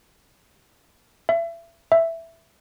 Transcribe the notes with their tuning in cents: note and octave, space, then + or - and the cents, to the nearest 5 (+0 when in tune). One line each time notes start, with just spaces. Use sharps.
E5 +30
E5 +5